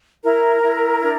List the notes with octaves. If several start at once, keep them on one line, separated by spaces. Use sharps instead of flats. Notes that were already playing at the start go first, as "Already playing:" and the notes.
E4 A#4 A#5
E4
D4